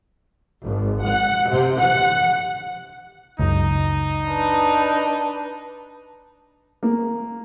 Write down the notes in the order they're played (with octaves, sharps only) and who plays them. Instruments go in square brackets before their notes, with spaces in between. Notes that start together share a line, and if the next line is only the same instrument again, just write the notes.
[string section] G#1
F#5
C3
F#5
[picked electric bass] F#1 C#2 [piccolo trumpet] D#4
[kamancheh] D4 B4
[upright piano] A#3